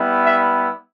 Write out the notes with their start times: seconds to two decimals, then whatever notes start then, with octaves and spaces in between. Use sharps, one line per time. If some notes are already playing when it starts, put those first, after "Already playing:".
Already playing: G3 B3 E4
0.22 E5